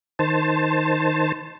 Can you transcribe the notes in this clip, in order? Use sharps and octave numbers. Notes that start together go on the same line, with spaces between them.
D#3 C5 A5